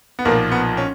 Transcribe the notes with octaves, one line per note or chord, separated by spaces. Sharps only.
B3
B1 A#2 F3 A#3
B3
C#4